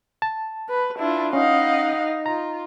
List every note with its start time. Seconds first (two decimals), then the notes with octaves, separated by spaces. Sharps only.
0.22 A5
0.69 B4
0.99 D4 E4 F4
1.33 C#4 D#4 D#5 F5 F#5
2.26 F4 A#5